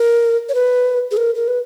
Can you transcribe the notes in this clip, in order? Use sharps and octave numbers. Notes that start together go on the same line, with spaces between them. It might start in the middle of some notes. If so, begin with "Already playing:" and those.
Already playing: A#4
C#5
B4
G#4
A#4
A#4
B4